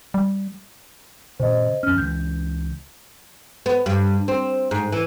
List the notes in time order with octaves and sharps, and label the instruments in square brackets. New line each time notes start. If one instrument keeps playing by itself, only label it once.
[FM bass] G3
[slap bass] A#2 C#3 [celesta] C5 D#5
[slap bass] F2 C#4 [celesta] F6
[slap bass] C#2 E3 [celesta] G6
[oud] B3
G2
C4
G#2
E3